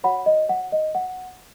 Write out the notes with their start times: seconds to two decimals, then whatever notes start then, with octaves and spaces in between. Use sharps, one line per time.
0.04 F#4 C#5 F#5 B5
0.26 D#5
0.49 F#5
0.72 D#5
0.95 F#5